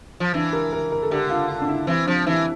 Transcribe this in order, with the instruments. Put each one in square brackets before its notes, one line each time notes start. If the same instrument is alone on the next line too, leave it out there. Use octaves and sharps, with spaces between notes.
[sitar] F3
[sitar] E3 [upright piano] D4
[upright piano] A#4
A#4
A#4
A4
[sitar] D3 [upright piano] G4
[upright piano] F4
F4
D4
E4
[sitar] E3 [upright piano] C4
[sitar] F3 [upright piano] D4
[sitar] E3 [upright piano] E4